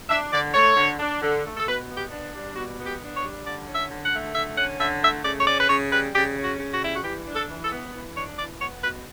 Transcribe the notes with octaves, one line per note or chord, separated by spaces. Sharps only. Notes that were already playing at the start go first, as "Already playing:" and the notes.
D4 E5
D3 D5
A3 C#5
D3
D4
D3
A3
A4
B2 B4
B3
G4
D4
G3
B2 F#4
B3
G4
D4
C#5
G3
D3 D5
C#4
E5
D3
F#5
A3
D3 E5
C#4 F#5
D3 E5
A3 E5
C#3 D5
C#5
C#4 D5
B4
C#3 C#5
G3 B4
C#3 G4
C#4
F#4
C#3
F#4
G3 E4
F#4
E3 G4
D4
A4
E3
A4
B3
E3
D4 C#5
E3 D5
B3 C#5
B2 B4